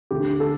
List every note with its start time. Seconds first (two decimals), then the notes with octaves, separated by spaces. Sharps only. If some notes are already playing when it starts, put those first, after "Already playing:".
0.11 D2 D3 A3 G4
0.40 A4